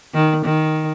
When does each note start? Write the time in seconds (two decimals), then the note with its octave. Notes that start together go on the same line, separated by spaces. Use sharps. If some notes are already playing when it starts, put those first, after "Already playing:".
0.14 D#3
0.45 D#3